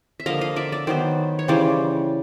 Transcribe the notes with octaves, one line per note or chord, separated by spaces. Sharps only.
E5
D3 F3 A#3 D#5 F5
D#5 F5
D5 E5
D5 E5
D#3 F#3 B3 C5 D5
C#5
C#3 E3 G3 C5 D5